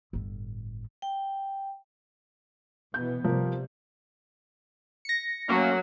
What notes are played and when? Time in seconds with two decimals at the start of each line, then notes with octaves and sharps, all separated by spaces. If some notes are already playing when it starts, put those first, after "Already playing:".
0.13 G1 A2
1.02 G5
2.94 B2 E3 B3 G6
3.24 C3 F3 G3 A#4
5.05 A#6 C#7
5.49 F#3 A3 A#3 C#4 F#4